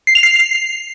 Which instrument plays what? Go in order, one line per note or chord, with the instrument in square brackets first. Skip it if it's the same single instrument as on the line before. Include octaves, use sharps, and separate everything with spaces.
[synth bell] C7
F7
C7